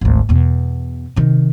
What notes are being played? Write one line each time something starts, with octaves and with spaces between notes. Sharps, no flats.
G#1 D2
E2 B2
C3 D#3